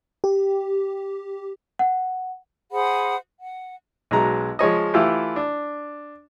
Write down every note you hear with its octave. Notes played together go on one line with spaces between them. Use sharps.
G4
F#5
G#4 C5 F#5 B5
F#5
B1 F#3 G#3 A#5
F3 G#3 C#5 D#5
E3 A3 E4 F4 G4
D4